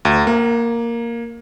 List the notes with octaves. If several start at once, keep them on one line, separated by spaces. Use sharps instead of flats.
D2
A#3